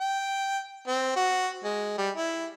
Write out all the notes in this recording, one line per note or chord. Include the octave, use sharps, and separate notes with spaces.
G5
C4
F#4
G#3
G3
E4